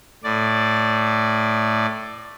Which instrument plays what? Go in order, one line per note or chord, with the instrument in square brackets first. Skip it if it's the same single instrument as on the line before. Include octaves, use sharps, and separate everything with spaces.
[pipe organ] A2 D5